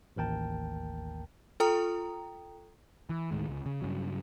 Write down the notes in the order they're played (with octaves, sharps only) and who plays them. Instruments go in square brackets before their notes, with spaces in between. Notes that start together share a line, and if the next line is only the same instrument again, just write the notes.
[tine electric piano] A1 D#2 A#4 G5 A5
[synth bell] F4 A4 G5 A#5 D#6
[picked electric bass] E3
D2 A2 D#3 G#3
C#2
C#3
G2 C#3 F#3